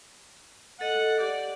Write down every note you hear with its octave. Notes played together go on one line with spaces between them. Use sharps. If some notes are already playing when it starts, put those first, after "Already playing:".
A4 D#5 F#5
G4 D5